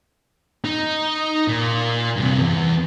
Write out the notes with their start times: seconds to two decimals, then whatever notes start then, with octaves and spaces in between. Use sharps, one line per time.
0.64 D#4
1.48 A#2
2.17 G2 C3
2.40 E2